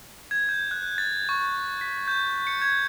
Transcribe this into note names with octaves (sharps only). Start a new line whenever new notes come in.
G#6
G6
F#6
A6
C#6
B6
G6
C#7
G#6